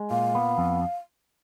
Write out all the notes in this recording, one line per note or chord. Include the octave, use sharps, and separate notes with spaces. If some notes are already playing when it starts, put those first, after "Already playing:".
Already playing: G#3
A#2 F5
B3
F2